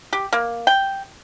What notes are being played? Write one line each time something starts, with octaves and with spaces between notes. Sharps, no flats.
G4
A#3
G5